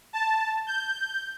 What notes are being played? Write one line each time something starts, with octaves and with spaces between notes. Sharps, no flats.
A5
G6